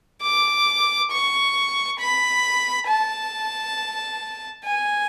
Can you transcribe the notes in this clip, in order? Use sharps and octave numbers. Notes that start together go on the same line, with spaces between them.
D6
C#6
B5
A5
G#5